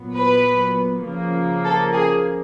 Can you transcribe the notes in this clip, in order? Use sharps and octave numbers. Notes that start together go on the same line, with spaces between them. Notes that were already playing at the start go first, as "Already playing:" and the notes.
Already playing: A#2 F#3 B3
B4
C#3 F3 A#3
A4
G#4